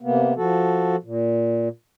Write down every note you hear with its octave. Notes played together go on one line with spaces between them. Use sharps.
C3 A#3 B3
F3 F#4 A4
A#2